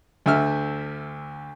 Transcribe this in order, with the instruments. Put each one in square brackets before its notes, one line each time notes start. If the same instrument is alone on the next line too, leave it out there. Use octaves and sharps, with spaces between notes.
[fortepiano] D2 D3 E5 F6